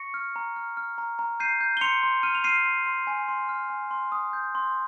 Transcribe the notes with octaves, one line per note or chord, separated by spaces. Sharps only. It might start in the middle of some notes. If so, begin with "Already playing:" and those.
Already playing: C#6 A#6 C#7
F6
A#5
F6
F6
A#5
A#5
G6 C7 D#7
G6
G7
C6 C#7 F7
C6
F6 D#7
F7
F6 C7 D#7
C6
C6
G#5
C6
F6
G#5
C6
D#6
G6
C6